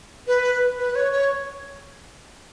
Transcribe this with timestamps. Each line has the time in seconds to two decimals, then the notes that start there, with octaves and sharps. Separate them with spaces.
0.27 B4
0.79 B4
0.95 C#5
1.12 C#5